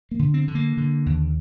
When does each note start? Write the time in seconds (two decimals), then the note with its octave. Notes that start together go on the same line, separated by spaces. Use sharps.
0.11 A#3
0.19 D3
0.34 C4
0.48 D3
0.55 A#3
0.77 D3
1.06 D#2